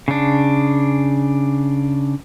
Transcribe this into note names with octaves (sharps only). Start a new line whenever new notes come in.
C#3 D4